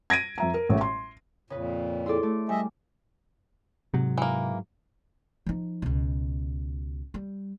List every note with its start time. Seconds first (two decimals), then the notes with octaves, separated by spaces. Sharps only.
0.10 G#6 A#6 D7 D#7
0.38 F2 E5 A#5
0.54 A#4
0.69 A1 A2 A3
0.81 C6
1.50 F2 A#2 C#3 B4
2.06 E4 G#4 A4 D5 C6
2.23 A3 D5
2.49 G3 D#5 E5 G#5
3.94 G#2 C3 F#3
4.18 E3 A#3
5.46 F3 D#4
5.82 C#2 B2
7.14 G3